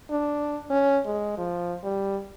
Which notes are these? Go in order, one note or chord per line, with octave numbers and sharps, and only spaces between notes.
D4
C#4
G#3
F3
G3